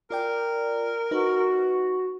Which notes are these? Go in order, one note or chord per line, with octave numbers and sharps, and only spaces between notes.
F4 A#4 D5 G5
D#4 F#4 B4